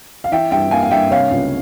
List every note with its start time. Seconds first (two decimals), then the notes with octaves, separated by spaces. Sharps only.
0.24 F5
0.32 E3 E5 G5
0.51 G2 E5 G5
0.71 A#3 F5 G#5
0.83 F5
0.91 G2 E5 G5
1.11 C3 C#5 F5
1.31 C#2